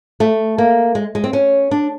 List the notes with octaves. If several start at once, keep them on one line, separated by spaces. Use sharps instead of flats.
A3
A#3
G#3
G#3
C4
C#4
D4